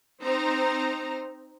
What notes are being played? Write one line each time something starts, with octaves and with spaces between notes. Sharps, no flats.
C4 D#4 C5 A#5